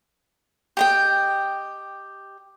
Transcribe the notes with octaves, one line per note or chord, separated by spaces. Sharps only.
G4 D#5 G5